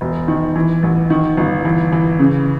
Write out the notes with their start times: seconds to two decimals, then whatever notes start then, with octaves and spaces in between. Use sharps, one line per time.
0.01 E1
0.28 D#3
0.56 E3
0.83 A1
1.10 D#3
1.37 G1
1.65 E3
1.92 E3
2.19 C#3